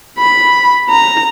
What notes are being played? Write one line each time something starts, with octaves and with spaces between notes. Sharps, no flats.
B5
A#5